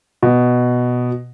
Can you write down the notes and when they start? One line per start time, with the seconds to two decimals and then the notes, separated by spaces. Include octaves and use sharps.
0.23 B2